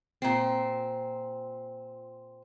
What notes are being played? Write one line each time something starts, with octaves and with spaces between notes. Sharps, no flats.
A#2 C4